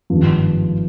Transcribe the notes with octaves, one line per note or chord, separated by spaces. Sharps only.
G#1 G2 F3